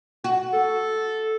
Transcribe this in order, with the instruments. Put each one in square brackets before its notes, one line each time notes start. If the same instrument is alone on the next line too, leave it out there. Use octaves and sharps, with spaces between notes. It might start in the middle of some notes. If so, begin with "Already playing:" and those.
[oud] F#4
[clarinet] A4